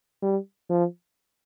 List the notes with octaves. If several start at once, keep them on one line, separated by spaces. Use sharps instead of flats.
G3
F3